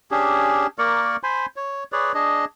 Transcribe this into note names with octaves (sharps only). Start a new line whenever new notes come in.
C#4 D4 G4 G#4
A#3 A#4 D5 C#6
C5 G#5 B5 C6
C#5
G#4 B4 C#5 D5
D4 G#4 D#5